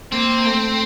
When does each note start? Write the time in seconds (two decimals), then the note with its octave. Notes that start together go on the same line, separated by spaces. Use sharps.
0.12 A#3 C4
0.45 A3